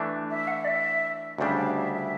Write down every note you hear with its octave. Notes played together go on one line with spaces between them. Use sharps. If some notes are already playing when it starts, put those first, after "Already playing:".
Already playing: E3 A3 D4
E5
F#5
E5
D5
E5
D2 C#3 G3 D4 E5
F5
E5
E5